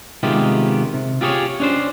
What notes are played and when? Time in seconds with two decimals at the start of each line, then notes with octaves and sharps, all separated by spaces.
0.23 C3 D#3 G#3 B3 F4 G4
0.94 C3
1.21 F4 G4 G#4 A#4 C#5
1.60 C#4 D4 C5